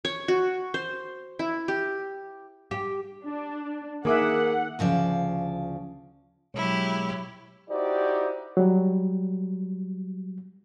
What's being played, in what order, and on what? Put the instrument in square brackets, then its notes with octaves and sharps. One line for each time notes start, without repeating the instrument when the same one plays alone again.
[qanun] C#5
F#4
C5
E4
G4
[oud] G4
[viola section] D4
[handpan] D#3 E5 [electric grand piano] A#3 G#4 D6 [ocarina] A#4 [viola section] F#5
[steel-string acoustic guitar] D2 C#3 F3 D5
[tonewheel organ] B2 G#3 C#5 [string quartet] F#3 E4 G4
[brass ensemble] D#4 E4 F#4 G4 C5 D5
[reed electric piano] F#3 G3